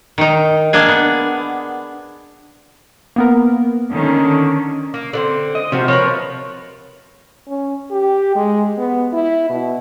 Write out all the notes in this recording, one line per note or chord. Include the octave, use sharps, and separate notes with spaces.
D#3 D#4
A#3 D4 G#4
B3
A#3 B3 A#4
D3 D#3 C#4
A#3
D3 B3 C4
D#5
C3 F3 C4 F#4
F3 A#4 B4 C#5
C#4
G4
G#3
B3
E4
B2